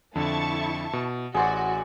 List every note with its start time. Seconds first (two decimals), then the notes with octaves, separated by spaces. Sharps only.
0.16 F2 D3 E4 A5 C#6
0.93 B2
1.34 A1 F#4 G#4 C5 D5